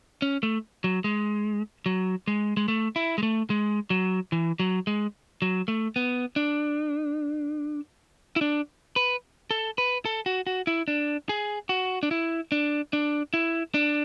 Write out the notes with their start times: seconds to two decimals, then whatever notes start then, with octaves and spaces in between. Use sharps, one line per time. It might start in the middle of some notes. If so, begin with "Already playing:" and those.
0.22 C#4
0.43 A3
0.84 F#3
1.04 G#3
1.86 F#3
2.27 G#3
2.57 G#3
2.68 A3
2.96 E4
3.18 G#3
3.23 A3
3.50 G#3
3.90 F#3
4.32 E3
4.60 F#3
4.87 G#3
5.42 F#3
5.68 A3
5.96 B3
6.36 D4
8.36 E4
8.41 D4
8.96 B4
9.51 A4
9.78 B4
10.05 A4
10.26 F#4
10.47 F#4
10.67 E4
10.88 D4
11.29 G#4
11.69 F#4
12.03 D4
12.11 E4
12.52 D4
12.93 D4
13.34 E4
13.74 D4